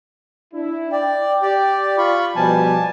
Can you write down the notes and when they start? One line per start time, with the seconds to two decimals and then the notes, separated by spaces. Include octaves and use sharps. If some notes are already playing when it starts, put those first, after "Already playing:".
0.54 D4 E4
0.92 D5 G5
1.42 G4 D5
1.98 F4 B5 C#6
2.36 B2 F3 G3 G#5 A5